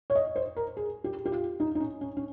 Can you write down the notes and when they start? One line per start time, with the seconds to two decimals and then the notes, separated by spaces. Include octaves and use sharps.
0.10 C#5
0.15 D#5
0.36 C5
0.56 A#4
0.77 G#4
1.04 G4
1.26 G4
1.32 F4
1.60 D#4
1.75 D#4
1.80 C#4
2.01 C#4
2.17 C#4